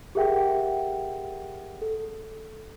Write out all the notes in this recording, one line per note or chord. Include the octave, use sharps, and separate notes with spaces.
G4 G#4 A#4 E5 F#5 G5
A4